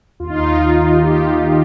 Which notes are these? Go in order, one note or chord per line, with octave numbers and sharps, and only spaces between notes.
D#2 F4
D#4
F4
D#3 D#4
G4
D#2 F4